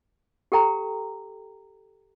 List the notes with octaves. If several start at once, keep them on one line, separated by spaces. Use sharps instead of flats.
G4 A4 G5 A#5